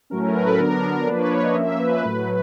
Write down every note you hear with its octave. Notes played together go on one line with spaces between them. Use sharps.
A2 F#3 A3 C#4 A#4
A#4
B4
A4
D3 F#3 B3 D4 A#4
A#4
A#4
F3 A#3 D4 B4
C#5
D#5
F3 A#3 C#4 E5
B4
A2 F#3 A3